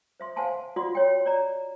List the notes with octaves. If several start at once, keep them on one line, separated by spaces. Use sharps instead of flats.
C5 E5 C6
C5 F5 F#5 G#5 A5 C6
F4 F#4 D5 F#5 C6
C#5 G5
C#5 D5 A#5